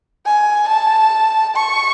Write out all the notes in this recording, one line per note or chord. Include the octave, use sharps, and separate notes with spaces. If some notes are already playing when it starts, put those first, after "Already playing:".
G#5
A5
C#6